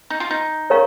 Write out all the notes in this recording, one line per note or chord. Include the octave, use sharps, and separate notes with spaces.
D#4
F4
D#4
A#4 C#5 F5 A#5 C#6